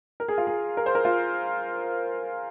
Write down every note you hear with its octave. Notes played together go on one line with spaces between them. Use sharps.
A#4
G#4
F4
G#4
A#4
C5
A#4
F4